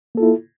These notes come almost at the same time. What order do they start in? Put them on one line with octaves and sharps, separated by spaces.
A#3 A4 F4 E4